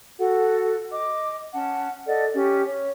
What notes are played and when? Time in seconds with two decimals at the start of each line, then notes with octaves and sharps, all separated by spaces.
0.19 F#4 A4 F#5
0.91 D#5 D6
1.54 C#4 F#5 A5
2.06 A4 D5 D#5 F#5
2.35 C#4 G4
2.64 C#5